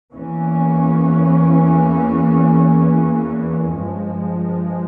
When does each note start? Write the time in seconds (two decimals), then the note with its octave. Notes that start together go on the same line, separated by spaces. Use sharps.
0.13 E2 E3 A#3 C#4
3.72 G2 F3 G#3